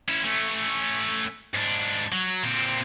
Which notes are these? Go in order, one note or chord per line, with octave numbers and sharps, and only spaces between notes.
C#4 E4
A3 C#4
G#2 D4
F#3
A#2 C4